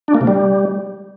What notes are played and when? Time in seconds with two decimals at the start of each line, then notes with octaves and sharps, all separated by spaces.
0.08 D4
0.15 A#3
0.21 C3
0.27 G3